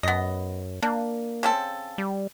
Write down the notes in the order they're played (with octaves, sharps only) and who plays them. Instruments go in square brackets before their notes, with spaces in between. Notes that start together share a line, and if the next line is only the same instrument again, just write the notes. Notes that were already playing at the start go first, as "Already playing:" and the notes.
[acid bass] F#2 [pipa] B3 D#5
[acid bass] A#3 [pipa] D4
[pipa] C#3 C4 A4
[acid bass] G3